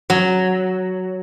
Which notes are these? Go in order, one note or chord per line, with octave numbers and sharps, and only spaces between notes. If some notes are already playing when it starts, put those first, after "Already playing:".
F#3